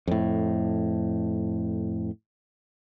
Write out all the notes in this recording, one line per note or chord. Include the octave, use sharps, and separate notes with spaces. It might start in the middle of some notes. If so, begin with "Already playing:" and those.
F2 A2